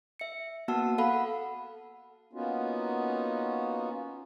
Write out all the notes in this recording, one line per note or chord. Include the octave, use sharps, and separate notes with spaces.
E5 C#7
A#3 B3 F#4 F#5 A5 E6
A4 F5 F#5 B5
A#3 B3 C#4 D#4 F4 F#4